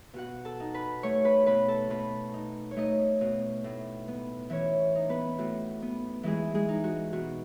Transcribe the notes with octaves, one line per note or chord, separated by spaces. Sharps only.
B2 F#4 F#5
A4 A5
D#4
B4 B5
A3 C#5 C#6
B4 B5
B2 B4 B5
A4 A5
B2 B4 B5
D#4
C#5
A3 D#4 D#5
B2
A2
B3
E3 C#4 C#5
D#4
B3 B4
A2 F#4
B3
E3 G#3 G#4
G#3 G#4
D#4
F#4
B2 F#4